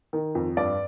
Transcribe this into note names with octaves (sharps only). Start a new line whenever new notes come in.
D#3
F2
G2 D5